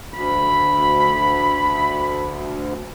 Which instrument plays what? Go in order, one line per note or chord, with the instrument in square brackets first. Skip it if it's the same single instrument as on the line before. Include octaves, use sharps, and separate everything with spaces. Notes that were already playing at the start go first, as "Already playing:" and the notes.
[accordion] D2 [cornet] B5